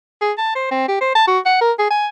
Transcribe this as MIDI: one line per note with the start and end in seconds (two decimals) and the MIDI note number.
0.22 0.33 68
0.38 0.55 81
0.56 0.70 72
0.71 0.88 60
0.89 0.98 67
1.01 1.13 72
1.15 1.24 81
1.28 1.39 66
1.46 1.60 78
1.61 1.72 70
1.79 1.90 68
1.91 2.08 80